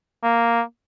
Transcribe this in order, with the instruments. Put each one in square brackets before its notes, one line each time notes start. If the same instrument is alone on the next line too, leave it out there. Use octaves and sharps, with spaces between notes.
[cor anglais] A#3